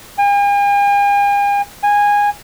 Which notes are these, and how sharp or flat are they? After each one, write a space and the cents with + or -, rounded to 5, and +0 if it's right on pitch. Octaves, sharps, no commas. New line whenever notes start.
G#5 -45
G#5 -15